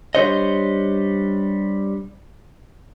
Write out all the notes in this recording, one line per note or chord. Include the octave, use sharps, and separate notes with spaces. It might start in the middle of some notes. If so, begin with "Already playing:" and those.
G3 D4 C5 C#5 D#5